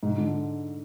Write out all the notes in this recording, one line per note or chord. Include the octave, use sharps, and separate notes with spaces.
G#2
D3